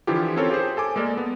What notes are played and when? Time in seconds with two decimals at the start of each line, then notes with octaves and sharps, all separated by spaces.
0.07 D3 E3 F3 E4 F4 G4
0.36 C4 C#4 F4 A4 A#4 C#5
0.51 G4 G#4 C5
0.77 A4 G#5 D6
0.96 G#3 A#3 A4 A#4 D5
1.17 B3